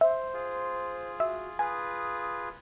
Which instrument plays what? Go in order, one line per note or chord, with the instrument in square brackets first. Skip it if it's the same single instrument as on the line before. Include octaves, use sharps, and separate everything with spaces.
[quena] C5 [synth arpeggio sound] E5
[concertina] F4 G#4
[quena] F#4 [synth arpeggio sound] E5
[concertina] F4 G#4 B4 [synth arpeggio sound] G#5 [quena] D#6